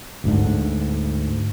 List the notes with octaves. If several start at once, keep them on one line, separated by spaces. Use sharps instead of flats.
D2 G#2 D4